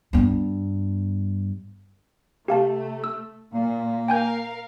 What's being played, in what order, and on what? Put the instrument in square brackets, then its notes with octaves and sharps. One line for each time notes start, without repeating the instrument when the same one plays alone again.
[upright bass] G2 B3
[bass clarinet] C3 [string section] A3 [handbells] G4 F5 A5
[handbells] E6
[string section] A#2 [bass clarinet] A#3
[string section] A#4 F5 [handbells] G5 G#5 G6